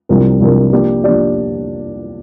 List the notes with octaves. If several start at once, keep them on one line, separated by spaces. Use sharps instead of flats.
C2 C3 F3 D4 A#4
C2 C3 F3 D4 A#4
F3 A#3 D4 G4 D5
F3 A#3 D4 G4 D5